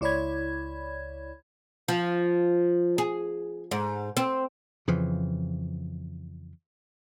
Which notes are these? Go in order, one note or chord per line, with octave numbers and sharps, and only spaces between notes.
C#2 E4 C#5 D5 B5 G#6
F3
G#4
G#2
C4
F2 C#3 E3 F3